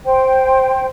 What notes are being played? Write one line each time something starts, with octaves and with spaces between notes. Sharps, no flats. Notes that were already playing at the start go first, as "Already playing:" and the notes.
C5 G5